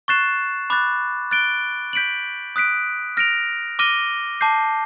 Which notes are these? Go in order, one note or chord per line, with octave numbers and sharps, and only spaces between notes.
C#6 F#6 A6 C7 E7
B5 D6 F#6 A6
F#6 A6 D7 G7
G6 B6 D7 F#7
D#6 F#6 B6 D7
F6 A#6 D7 F7
D6 F6 A#6 D#7 G7
A5 D6 G6 C7